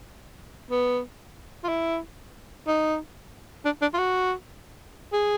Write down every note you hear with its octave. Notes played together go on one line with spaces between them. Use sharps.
B3
F4
E4
D#4
D4
D4
F4
F#4
G#4